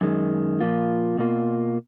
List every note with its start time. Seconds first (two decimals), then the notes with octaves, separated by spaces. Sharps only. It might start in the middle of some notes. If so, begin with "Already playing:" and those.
0.01 F#2 D#3 G#3
0.60 A#2 F3 A#3 F4
1.18 B2 A#3 F4